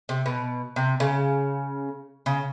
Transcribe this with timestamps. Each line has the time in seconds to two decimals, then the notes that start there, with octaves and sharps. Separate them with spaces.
0.09 C3
0.26 B2
0.76 C3
1.00 C#3
2.26 C#3